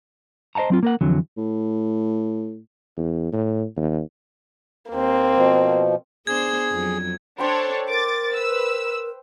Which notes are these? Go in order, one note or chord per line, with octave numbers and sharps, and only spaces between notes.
C5 D#5 F#5 A5 A#5
F#3 C4 F4
A#3 A#4 F#5
F2 D3 E3 F#3
A2
E2
A2
D#2
D#2 A#3 C4
B2 F3
B3 D4 G#4 C5 G#6
F2 F#3
D4 A4 C5 C#5 G5 B5
A#4 D6 A6
B4 E6